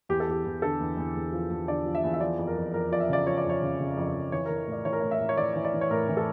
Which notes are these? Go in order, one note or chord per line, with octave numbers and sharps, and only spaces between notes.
E2 G4
A4
E2 G4
E2
D3 A4
E2
E2
E2
F3
E2
D3 D5
F3
E5
E2
E5
F3 D5
F2
A#4
F2
F2 A#4
F3 D5
E5
C#3 D5
F3 C#5
D5
F2
C#5
C#3
C#3
F2
F2
E3 C#5
A#4
E3
A2 D5
E3 C#5
A#4
A2 C#5
E5
A2
C#5
E3 D5
E3 C#5
D5
E3
C#5
A2 A#4
E3
A4